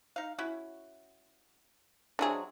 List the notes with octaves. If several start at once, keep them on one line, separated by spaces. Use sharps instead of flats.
D#4 F5
C#4 E4 F#4
C3 F#3 G#3 D4 G#4